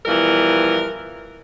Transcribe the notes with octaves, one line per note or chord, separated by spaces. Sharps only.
B2 E3 F3 G3 A#4